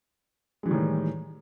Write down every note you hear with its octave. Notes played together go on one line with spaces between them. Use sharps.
A2 D#3 E3 G3 G#3